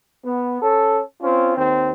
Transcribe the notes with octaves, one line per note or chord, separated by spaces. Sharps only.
B3
C#4 A4
C4 C#4 F4
D#2 D#3 C4